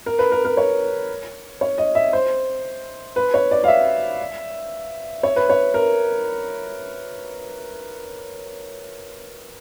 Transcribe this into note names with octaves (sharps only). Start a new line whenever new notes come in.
A#4
B4
A#4
A#4
C#5
C#5
D#5
E5
C5
B4
C#5
D5
F5
E5
C#5
B4
C#5
A#4